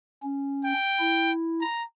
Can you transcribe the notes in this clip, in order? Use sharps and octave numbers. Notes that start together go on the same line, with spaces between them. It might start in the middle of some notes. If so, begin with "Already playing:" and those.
C#4
G5
E4
A#5